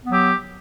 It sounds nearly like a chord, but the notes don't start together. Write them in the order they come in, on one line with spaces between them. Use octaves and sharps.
B3 F#3 G4